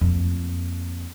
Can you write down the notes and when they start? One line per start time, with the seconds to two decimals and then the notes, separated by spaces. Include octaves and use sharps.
0.01 F2 A#3